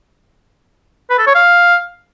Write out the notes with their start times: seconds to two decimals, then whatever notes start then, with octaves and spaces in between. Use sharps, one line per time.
1.10 B4
1.18 A4
1.27 C#5
1.35 F5